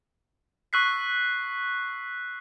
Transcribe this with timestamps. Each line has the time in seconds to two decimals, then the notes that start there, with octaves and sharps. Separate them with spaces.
0.73 C#6 E6 F#6 B6 C7